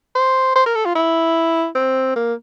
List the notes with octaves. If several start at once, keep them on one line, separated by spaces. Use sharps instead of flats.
C5
C5
A#4
A4
F4
E4
C4
A#3